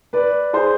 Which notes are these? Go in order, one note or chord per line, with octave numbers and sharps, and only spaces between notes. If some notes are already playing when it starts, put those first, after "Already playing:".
B4 D5
G#4 C5